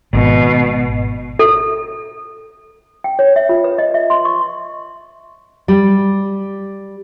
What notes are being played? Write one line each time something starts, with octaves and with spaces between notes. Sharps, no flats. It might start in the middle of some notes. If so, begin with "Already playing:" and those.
G#1 B2
A4
G5
C#5
E5
F4
B4
D#5
E5
C6
C#6
G3